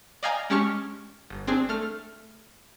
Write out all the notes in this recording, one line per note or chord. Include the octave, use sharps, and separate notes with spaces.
D5 D#5 F5 G5 G#5 A#5
G#3 C#4 G4 A5 C#6 F6
G1
C4 D4 G#4
A3 F6